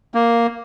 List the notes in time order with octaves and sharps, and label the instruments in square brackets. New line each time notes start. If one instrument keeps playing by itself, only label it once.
[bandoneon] A#3